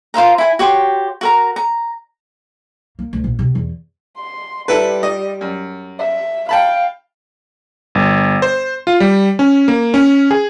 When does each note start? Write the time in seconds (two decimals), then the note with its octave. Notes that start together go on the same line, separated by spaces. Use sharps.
0.14 F4 C5 F5 A#5
0.38 E4 G#5
0.59 F#4 G4 C#5 C6
1.21 F#4 A#4 A#5
1.56 A#5
2.99 A#3
3.13 D2
3.24 A#1
3.39 C3
3.55 E2
4.16 C6
4.68 G3 E4 A4 B4
5.03 D#5
5.41 F#2
5.99 E5
6.49 F5 G5 A5 B5
7.95 G1
8.42 C5
8.87 F4
9.00 G3
9.39 C#4
9.68 A#3
9.94 C#4
10.31 G#4